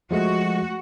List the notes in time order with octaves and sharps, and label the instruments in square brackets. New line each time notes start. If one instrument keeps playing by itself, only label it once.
[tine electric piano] F3 G#3 A3 [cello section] F#4